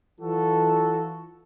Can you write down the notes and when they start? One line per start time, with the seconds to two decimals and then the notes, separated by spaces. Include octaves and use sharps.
0.21 E3 F#3 F4 F#4 A4